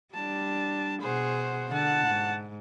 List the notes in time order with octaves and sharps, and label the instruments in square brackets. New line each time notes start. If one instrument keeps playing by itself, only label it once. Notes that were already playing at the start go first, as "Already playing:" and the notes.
[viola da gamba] G3 D4 [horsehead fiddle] A5
[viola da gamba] B2 G#4 [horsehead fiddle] C5 F#5
[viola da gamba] D3 [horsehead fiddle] F#5 A5
[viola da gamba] G#2